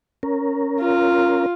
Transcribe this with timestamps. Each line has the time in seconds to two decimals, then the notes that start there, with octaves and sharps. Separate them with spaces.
0.23 C#4 A#4
0.81 F4